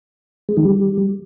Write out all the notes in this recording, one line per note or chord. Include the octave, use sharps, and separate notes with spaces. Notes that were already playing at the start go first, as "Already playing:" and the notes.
G#3
D#3
G3